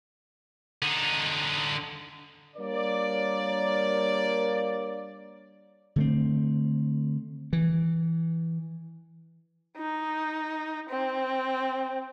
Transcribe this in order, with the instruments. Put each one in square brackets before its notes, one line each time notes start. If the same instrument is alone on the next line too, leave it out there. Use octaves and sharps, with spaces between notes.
[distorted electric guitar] D3 D#4
[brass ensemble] G3 A#3 D4 A#4 C#5 D5
[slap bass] D3 A3 C4
E3
[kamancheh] D#4
C4